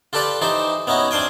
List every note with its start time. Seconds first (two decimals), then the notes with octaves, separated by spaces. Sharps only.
0.13 F4 G4 A4 B4 D5
0.41 E3 D#4 G4 C5
0.87 B3 C#4 D#4 E4 F#4
1.11 C4 D4 F5 G5 G#5